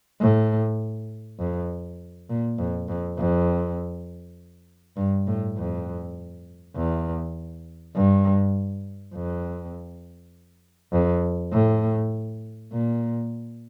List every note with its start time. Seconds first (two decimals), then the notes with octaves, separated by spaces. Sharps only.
0.20 A2
1.39 F2
2.29 A#2
2.58 F2
2.88 F2
3.18 F2
4.97 G2
5.27 A2
5.57 F2
6.76 E2
7.95 G2
9.15 F2
10.92 F2
11.53 A2
12.72 A#2